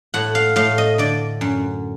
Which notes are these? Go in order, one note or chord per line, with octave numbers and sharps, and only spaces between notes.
A2 F#5
F5
A2 F5
D#5
D3 D5
F#2